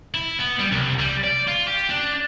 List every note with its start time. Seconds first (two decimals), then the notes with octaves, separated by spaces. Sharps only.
0.14 E4
0.39 B3
0.59 G3
0.72 C2
0.99 G3
1.24 D5
1.48 F4
1.68 G4
1.90 D4